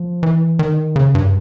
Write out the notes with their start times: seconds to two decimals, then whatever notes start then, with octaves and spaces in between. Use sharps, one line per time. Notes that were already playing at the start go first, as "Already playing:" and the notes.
Already playing: F3
0.23 E3
0.59 D#3
0.96 C#3
1.15 G2